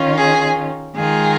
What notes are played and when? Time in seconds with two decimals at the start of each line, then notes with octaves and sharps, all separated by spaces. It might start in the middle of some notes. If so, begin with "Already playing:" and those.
Already playing: D#3 C#4 F4
0.18 G#4
0.96 D#3 G#3 F4 G#4